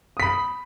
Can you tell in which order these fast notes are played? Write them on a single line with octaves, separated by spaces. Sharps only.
D#6 B6 B5